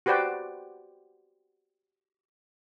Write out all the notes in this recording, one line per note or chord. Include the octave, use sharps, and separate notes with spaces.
F#4 G4 B4 C5 D5 G5